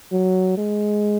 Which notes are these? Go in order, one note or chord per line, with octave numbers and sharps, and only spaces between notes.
F#3
G#3